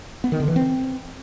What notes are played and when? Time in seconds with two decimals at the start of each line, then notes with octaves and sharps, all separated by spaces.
0.24 B3
0.32 D#3
0.40 D3
0.48 E3
0.56 C4